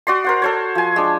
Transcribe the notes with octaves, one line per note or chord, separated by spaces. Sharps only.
F#4 D5 C6
A#4 C5 F#5
A4 C5 C#5
F3 G#5
G#3 D4